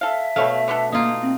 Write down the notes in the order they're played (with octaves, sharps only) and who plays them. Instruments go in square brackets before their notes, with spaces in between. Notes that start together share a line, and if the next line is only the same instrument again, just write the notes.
[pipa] A4 F5 [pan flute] E5
[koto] B2 A3 [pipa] B4 C#5 F5
[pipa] D3 B3 A4
[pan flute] A#3 [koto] D#4 F4
[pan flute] C4